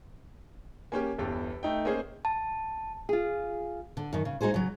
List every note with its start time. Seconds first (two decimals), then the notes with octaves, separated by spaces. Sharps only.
0.92 A#3 C#4 G4 G#5
1.18 G1 E2 G4 A4
1.63 A3 D#4 G5
1.85 A#3 C#4 G#4 C5 D#5
2.25 A5
3.09 F4 G#4
3.97 D3
4.13 F#2 D#3
4.25 C#3
4.41 G#3 D#4 F#4 G#4 C5
4.54 C#3 F#3